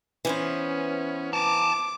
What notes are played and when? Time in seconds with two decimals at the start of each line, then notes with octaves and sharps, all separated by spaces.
0.25 E3 B3 C#4 C5
1.33 G#5 A5 D6